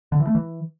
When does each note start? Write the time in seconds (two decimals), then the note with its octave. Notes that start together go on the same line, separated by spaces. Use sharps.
0.12 D3
0.20 E3
0.27 A3
0.35 E3